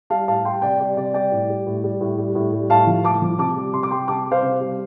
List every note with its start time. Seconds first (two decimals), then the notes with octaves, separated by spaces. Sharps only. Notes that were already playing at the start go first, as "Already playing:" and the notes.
0.10 G3 F5 A5
0.28 A2 F5 A5
0.45 G3 G5 C6
0.62 C3 D5 G5
0.79 G3 D5
0.97 C3 D5
1.14 G3 D5 G5
1.32 A2
1.50 G3
1.66 A2
1.84 G3
2.01 A2
2.18 G3
2.35 A2
2.53 G3
2.70 A2 F5 A5
2.87 F3
3.04 A2 A5 D6
3.22 F3
3.39 C3 A5 D6
3.56 G3
3.74 C3 C6
3.83 D6
3.91 G3 G5 C6
4.08 C3 A5 D6
4.26 G3
4.31 C5 F5
4.43 C3
4.60 G3